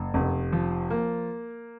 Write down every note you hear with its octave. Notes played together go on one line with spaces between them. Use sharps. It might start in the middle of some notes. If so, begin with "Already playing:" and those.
Already playing: F#1
F1
F3
A#3